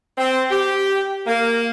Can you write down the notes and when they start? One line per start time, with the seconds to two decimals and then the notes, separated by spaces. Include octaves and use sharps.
0.18 C4
0.51 G4
1.26 A#3